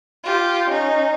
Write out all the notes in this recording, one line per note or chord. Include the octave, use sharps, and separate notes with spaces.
F4 G4
C#4 D#4